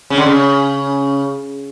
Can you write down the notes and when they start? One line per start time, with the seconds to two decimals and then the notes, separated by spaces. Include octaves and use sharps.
0.10 C#3
0.18 D3
0.26 C#3